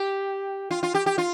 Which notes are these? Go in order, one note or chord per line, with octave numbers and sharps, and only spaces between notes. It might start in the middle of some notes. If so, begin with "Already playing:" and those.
Already playing: G4
F4
F4
G4
G4
F4